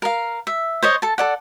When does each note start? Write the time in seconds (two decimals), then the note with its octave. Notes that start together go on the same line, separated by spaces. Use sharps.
0.02 A#4 F5
0.47 E5
0.82 C5 C#5 D#5
1.02 A4 A5
1.18 A4 D5 F#5